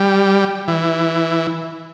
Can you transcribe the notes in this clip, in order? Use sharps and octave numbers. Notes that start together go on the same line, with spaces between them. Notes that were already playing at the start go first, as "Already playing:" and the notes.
Already playing: G3
E3